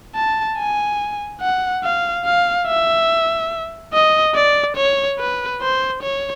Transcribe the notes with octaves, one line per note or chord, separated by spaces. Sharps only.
A5
G#5
F#5
F5
F5
E5
D#5
D5
C#5
B4
C5
C#5